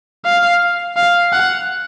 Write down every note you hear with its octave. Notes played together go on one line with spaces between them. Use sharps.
F5
F5
F#5